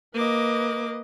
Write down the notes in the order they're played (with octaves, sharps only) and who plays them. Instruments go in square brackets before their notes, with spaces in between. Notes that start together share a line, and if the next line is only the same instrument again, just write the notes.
[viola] A#3 D6 [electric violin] B4 D#5